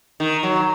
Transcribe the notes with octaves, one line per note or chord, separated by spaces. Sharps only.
D#3
F#3